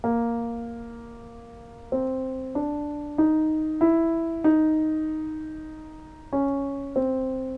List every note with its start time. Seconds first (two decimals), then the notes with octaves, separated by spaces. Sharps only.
0.04 A#3
1.92 C4
2.55 D4
3.18 D#4
3.81 E4
4.44 D#4
6.33 C#4
6.96 C4